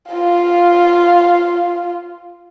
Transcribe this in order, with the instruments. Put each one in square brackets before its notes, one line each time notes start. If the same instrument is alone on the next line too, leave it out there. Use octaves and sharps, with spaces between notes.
[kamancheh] F4 F5